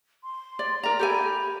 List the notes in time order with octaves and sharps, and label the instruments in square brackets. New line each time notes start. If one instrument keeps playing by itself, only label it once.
[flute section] C6
[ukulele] D5
[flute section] D#4 D5 [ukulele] A#4 A#5
[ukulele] G4 A4 G#5 [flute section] B5